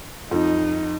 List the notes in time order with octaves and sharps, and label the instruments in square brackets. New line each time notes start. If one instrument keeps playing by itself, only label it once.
[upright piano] F2 [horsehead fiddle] D#4